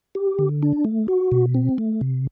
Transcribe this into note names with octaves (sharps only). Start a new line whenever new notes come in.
G4
D3
D4
A3
F#4
B2
C4
A3
C3